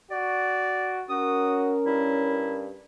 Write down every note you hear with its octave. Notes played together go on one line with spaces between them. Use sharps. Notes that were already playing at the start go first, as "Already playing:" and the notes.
F#4 D5
C#4 F#4 A#4 D#6
G2 E4